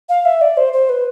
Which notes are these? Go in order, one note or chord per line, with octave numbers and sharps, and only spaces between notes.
F5
E5
D5
C5
C5
B4